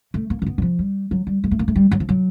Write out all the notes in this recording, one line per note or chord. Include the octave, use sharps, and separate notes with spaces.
A3
A#3
A#3
B3
E3
F3
G3
F#3
G3
G#3
A3
A#3
A3
G3
F#3
F3
F#3